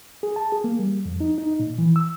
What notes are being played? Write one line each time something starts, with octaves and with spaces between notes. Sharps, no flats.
G#4
A5
G#4
A#3
G3
F2
D#4
D#4
A#2
E3
E6